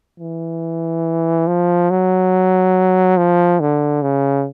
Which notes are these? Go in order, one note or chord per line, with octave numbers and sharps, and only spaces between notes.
E3
F3
F#3
F3
D3
C#3